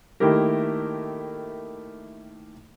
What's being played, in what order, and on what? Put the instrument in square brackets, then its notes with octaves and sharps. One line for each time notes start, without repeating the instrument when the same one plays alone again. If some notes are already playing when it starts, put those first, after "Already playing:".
[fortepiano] D#3 A3 A#3 E4 G4 A#4